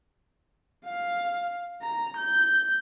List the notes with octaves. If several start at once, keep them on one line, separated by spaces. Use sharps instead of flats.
F5
A#5
G6